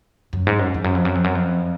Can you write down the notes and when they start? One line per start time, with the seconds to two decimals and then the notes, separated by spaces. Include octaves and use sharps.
0.33 F#2
0.47 G#2
0.59 F#2
0.74 F2
0.84 F#2
0.95 F2
1.05 F#2
1.15 F2
1.24 F#2
1.35 F2